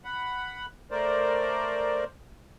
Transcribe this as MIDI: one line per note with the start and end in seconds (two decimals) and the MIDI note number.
0.04 0.66 78
0.04 0.66 83
0.91 2.04 57
0.91 2.04 70
0.91 2.04 72
0.91 2.04 74